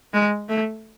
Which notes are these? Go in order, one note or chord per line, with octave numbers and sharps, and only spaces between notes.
G#3
A3